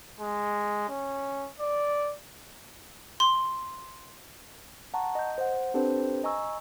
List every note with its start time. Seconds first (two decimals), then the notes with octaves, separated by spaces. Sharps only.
0.20 G#3
0.89 C#4
1.59 D5
3.20 C6
4.94 F#5 A5 A#5 C#6
5.15 D#5 G6
5.38 C5 F#5
5.74 C4 D4 G4 A4 B4 C5
6.24 D#5 G#5 A#5 C#6 E6